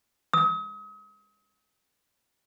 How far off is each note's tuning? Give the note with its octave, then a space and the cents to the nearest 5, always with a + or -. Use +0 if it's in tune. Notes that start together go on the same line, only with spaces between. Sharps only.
D#6 +40